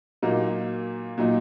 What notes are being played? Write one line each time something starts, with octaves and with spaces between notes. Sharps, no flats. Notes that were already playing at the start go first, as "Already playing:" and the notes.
A#2 F#3 A#3 D#4
A#2 F#3 D#4